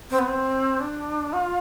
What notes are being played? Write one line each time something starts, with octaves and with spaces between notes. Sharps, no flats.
C4
B3
C4
D4
F4